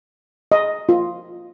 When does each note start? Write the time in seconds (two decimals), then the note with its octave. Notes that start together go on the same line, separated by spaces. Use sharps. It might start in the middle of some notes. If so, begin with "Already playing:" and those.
0.52 D#5
0.89 F4